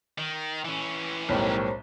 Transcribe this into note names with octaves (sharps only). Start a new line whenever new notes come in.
D#3
E3 C#4
B1 A2 G3 A#4 C5 C#5